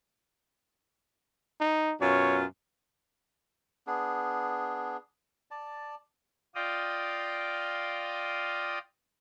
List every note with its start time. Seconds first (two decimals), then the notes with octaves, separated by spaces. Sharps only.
1.60 D#4
2.01 F#2 B2 F4 C#5
3.87 B3 D4 G#4
5.51 D5 A5
6.55 F4 D5 D#5 F5 G5 D#6